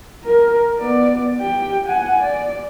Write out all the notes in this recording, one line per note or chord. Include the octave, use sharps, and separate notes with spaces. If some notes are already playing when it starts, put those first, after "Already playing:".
A#4
B3 D5
G4 G5
F#5 G#5
D5